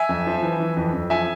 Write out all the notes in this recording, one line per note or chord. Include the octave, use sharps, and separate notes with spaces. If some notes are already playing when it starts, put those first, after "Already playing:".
Already playing: E5 G#5
F2
F3
E3
E3
F2
F2
F3 E5 G#5